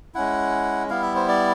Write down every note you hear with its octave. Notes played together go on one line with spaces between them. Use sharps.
G#3 C#4 E4 F#5
G3 B3 E4 F5
E5
C5
D5